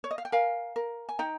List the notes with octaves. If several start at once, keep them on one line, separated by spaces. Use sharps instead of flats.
C#5
D#5
F5
G5
A#4 F5 G#5
A#4
G#5
D#4 G5 A#5